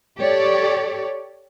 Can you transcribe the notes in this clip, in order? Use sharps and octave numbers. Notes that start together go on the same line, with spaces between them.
G4 A4 C#5 D5